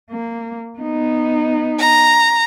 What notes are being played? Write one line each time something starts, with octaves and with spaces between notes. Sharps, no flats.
A#3
B3 D#4
A#5